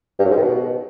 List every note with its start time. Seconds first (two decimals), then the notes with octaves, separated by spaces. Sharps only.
0.19 G2
0.25 F#2
0.31 G#2
0.36 D#3
0.42 B2